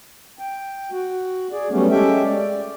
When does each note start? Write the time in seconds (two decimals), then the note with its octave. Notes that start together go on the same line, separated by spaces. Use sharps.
0.39 G5
0.92 F#4
1.52 G#4 D5
1.71 F#3 G3 A3 B3 C#4
1.91 G#3 C#4 G4 A4 E5 G5
2.25 D5